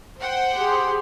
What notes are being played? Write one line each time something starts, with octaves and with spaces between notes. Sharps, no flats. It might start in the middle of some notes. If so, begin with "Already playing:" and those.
C5 F#5 G5
G4 G#4 C6